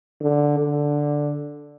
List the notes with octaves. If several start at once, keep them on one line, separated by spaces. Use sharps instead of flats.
D3
D3